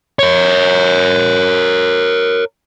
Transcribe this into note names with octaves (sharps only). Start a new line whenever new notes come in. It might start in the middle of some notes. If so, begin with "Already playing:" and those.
A#4 C#5